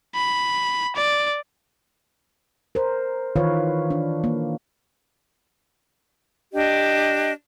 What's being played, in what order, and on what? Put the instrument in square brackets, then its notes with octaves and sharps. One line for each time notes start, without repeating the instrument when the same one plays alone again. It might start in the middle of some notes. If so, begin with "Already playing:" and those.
[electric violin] B5
D5
[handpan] A#4 C5
D#3 E3 F4 B4 C#5 F5
D4
A#3
[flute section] D4 G4 D#5